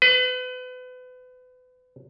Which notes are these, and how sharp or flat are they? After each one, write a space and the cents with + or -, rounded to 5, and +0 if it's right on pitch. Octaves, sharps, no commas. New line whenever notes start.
B4 +35